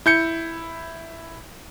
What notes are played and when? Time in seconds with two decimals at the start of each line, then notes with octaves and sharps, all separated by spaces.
0.06 E4 G6 C#7